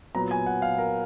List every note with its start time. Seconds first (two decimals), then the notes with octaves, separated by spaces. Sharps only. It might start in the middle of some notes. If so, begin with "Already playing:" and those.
0.15 A#2 F#3 B3 A#5
0.31 G#5
0.46 F#5
0.62 F5
0.78 A#4